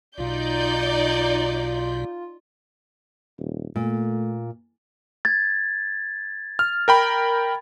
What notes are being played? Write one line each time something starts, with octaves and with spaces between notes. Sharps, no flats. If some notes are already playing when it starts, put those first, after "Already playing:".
B1 B2 D#4 F4 D5 G6
D#1
A#2 A3
G#6 A6
F6
A#4 G5 B5